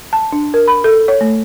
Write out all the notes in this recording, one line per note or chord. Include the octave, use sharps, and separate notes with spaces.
A5
D4
A#4
B5
A4
C#5
A3